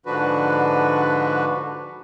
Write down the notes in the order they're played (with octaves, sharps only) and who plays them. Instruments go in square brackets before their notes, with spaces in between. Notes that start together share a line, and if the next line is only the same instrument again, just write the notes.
[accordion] G#2 D3 F3 D4 F#4 B4